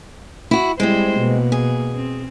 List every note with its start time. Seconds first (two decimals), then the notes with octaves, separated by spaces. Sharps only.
0.51 E4 F#4
0.80 G3 G#3 C4 E4 C5
1.18 B2 A#3
1.52 G#4
1.96 C4